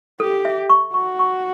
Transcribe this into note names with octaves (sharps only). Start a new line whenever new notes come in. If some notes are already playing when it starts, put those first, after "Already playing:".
G4 A4
E5
C#6
F#4 C#6
C#6